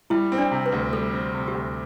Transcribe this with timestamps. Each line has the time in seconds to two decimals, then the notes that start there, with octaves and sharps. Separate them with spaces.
0.10 G3 E4 E5
0.32 C4
0.38 D4 D5
0.51 C3
0.66 B4
0.72 D2
0.93 G3 A4
1.14 C4
1.35 C3
1.48 G4
1.54 D2